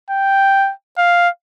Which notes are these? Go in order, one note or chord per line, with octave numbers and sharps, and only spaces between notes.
G5
F5